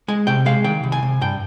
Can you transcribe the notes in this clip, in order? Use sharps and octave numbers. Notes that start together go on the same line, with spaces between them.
G#3 G#5
C3 G5
G#3 F5
D#3 G5
C2
G#5
C3
G2 G5